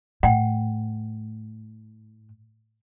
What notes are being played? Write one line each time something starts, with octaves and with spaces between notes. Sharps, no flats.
A2 F#5 G5